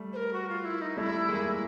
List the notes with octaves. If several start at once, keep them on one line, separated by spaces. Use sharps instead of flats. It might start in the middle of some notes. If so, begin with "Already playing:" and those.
Already playing: G3 A3
C5
A#4
F#4
F4
E4
D#4
G3 A3 E4
G#3 A#3